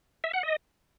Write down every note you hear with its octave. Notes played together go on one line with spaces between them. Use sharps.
E5
F#5
D#5